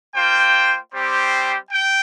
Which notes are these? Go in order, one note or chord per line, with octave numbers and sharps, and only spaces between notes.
A#3 F4 C5 G5
G3 C4 G4 C5
G5